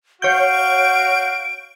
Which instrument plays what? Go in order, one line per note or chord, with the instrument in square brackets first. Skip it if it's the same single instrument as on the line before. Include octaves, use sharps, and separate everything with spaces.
[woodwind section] F#4 F5 [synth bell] C#5 G6 [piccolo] D7